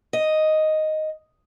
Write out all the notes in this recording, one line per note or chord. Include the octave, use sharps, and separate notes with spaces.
D#5